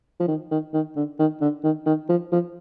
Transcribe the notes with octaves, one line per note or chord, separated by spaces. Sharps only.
F3
D#3
D#3
D#3
D3
D#3
D3
D#3
D#3
F3
F3